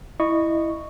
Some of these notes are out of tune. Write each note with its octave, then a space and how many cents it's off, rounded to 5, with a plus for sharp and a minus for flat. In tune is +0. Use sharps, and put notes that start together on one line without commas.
E4 +0 D#5 -25 C#6 +0